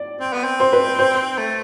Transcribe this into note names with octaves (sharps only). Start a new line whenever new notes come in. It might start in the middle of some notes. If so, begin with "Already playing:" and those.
Already playing: D5
C4
B3
C4
C5
B4
C5
A3